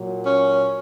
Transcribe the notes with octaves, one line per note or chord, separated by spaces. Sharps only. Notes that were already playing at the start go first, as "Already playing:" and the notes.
Already playing: A#2 F#3
C#4